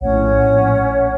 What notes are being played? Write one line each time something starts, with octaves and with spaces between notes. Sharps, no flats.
A#1 A2 C#4 C#5 F#5